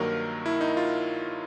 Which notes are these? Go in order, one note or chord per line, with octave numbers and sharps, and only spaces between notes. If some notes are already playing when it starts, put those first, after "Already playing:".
Already playing: G2 D#3 F#3 A#3 A#4
E4
D#4
F4